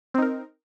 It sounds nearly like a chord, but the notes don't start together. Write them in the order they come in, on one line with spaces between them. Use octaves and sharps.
C4 D#4 A#4